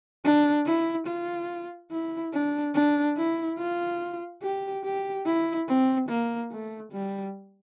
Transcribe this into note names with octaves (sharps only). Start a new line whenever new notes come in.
D4
E4
F4
E4
D4
D4
E4
F4
G4
G4
E4
C4
A#3
A3
G3